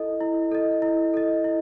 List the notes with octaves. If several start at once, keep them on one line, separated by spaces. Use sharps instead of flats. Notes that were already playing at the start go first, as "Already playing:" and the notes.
Already playing: E4 A4 D#5
E4
A4 D#5
E4
A4 D#5
E4